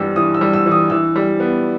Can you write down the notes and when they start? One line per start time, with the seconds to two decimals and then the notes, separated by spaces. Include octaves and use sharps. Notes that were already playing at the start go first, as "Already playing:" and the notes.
Already playing: G2 E3 G3 E6
0.16 E3 D#6
0.34 E6
0.41 G3
0.53 E6
0.66 E3
0.71 D#6
0.90 E3 E6
1.16 G3
1.40 B3